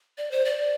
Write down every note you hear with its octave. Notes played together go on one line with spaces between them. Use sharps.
D5
C5
D5